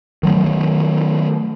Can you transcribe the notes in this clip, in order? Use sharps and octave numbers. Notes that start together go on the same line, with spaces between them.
D#3 F#3 A3